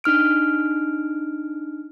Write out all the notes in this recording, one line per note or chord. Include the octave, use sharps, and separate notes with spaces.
D4 D#4 F6 D7